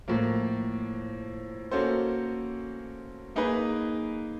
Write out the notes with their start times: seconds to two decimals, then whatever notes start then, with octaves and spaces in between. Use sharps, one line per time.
0.08 A2 F3 A#3
1.71 A#3 C#4 F#4 A4 C5
3.36 A#3 D#4 G#4 B4